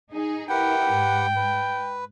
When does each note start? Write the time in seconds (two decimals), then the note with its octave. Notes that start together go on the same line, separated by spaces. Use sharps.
0.12 D#4 G#4
0.49 E4 G4 A#4 B4 F#5 G5
0.93 G#2
1.36 B4